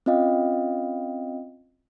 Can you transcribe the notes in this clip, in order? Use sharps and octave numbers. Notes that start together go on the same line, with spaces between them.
C4 C#4 F4 D#5 F5 G5